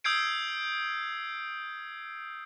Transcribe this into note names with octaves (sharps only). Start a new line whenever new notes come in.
D#6 E6 G6 G#6 C7 D7